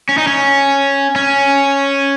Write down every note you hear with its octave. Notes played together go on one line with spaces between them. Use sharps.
C#4
D#4
C#4
C#4